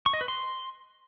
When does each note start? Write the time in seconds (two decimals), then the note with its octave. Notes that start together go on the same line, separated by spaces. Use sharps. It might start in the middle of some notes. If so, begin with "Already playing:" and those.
0.06 C#6
0.13 D#5
0.21 B4
0.28 C6